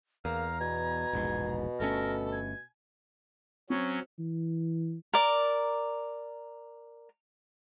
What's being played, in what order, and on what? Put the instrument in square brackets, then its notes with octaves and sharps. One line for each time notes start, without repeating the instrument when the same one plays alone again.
[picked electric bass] E2 [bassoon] A#3 [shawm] F5 [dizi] A#5
[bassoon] B2 [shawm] G#5
[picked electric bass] E1 A#1 G#2
[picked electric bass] G1 A3 C#4 [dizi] A4 [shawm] A#4
[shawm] G#5
[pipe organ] F#3 C#4 [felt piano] C4
[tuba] E3
[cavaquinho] A#4 D5